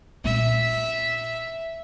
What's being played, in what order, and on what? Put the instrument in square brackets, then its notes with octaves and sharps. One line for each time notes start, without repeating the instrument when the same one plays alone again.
[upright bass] A#2 C#4 [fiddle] E5